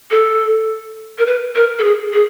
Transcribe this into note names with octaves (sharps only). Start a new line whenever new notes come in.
A4
A#4
B4
A#4
A4
G#4
G#4